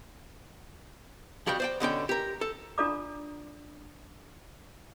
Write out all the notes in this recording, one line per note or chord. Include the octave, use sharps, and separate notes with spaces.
F2 G3 F#4 G5
C5 D5 G5
B2 D3 C#4 G5
G4 A#4
A4
D4 F4 A4 D5 A#5 D6